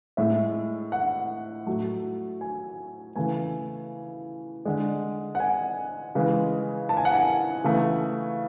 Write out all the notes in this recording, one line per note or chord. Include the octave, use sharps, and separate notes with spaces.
A2 G#3 E5
F#5
A2 F#3 A3
G#5
C#3 E3 A3 G#5
D3 G#3
F#5
G#5
C#3 E3 G#3
A5
G#5
F#5
G#5
C#3 E3 A3